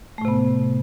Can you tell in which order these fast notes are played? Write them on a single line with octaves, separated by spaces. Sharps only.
A3 A2 C3 B3